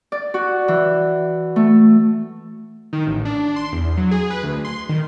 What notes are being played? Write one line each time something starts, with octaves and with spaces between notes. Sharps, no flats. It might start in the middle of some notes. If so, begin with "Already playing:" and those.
D5
F#4
E3
A3
D#3
A1
D4
C6
E2
F#3
G#4
B4
D2
C6
D#3